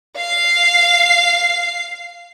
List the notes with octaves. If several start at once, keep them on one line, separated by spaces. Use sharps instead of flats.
F5 C7